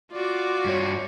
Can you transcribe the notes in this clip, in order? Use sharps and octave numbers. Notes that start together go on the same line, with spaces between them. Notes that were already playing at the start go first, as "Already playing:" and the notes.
F4 F#4 D5 D6
G2 C#5